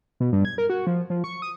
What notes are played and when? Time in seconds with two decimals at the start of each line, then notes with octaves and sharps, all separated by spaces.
0.20 B2
0.33 G2
0.45 G#6
0.58 A#4
0.70 F#4
0.87 F3
1.10 F3
1.24 C#6
1.42 D#6